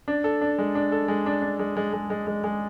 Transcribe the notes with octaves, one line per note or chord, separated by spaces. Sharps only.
D4
A4
D4
G#3
D4
A4
G#3
D4
D4
G#3
G#3
G#3
G#3
G#3
G#3